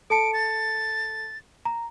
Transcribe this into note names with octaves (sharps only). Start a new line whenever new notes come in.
A4 A5 C#7 D7
A6
A#5